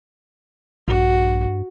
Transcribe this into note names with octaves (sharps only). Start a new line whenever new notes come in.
A#1 G2 F#4